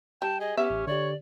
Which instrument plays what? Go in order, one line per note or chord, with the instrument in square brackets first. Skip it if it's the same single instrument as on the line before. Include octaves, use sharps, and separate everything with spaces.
[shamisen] G3 [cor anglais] G5 [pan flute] A5
[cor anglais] G#4 [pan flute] D#5
[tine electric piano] B3 [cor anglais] C#4 [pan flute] G4 [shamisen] E5
[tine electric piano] A1
[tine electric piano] D3 G4 [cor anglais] C#5 [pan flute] D5